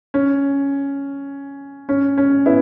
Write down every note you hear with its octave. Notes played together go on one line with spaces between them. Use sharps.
C#4
C#4
C#4
B3 E4